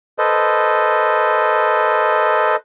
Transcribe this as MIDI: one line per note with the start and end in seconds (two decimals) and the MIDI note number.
0.19 2.56 69
0.19 2.56 71
0.19 2.56 72
0.19 2.56 75